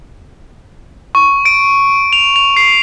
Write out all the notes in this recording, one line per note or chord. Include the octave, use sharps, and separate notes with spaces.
C#6
D7
F7
F7
C7